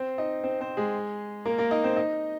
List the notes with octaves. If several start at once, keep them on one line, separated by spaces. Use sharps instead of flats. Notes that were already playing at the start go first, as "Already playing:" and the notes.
Already playing: C4 C5
D#4 D#5
C4 C5
C4 C5
G#3 G#4
A#3 A#4
A#3 A#4
D#4 D#5
C4 C5
D#4 D#5